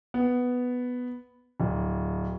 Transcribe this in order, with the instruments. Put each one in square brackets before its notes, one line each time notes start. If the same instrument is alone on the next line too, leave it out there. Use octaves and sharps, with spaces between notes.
[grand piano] B3
D1